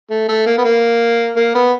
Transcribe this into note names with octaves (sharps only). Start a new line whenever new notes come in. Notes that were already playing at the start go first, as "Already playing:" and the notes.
A3
A3
A#3
B3
A#3
A#3
B3